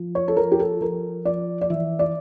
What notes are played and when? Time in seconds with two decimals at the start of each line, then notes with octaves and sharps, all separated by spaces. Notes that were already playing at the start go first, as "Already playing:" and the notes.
Already playing: F3
0.15 C#5
0.28 A4
0.37 F3 A#4
0.52 G4
0.59 A4
0.81 F3 A#4
1.25 F3 D5
1.61 D5
1.70 E3 E5
1.99 D5